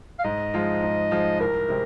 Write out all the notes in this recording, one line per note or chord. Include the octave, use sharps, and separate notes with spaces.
F5
G#2 D#5
F3 G#3 F4
G#2
F3 G#3 F4
C2 A#4
C3 G#3 C4